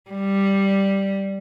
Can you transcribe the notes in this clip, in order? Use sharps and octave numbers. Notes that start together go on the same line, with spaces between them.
G3